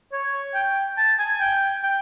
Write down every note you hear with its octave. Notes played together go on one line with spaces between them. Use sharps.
C#5
G5
A5
G#5
G5
G5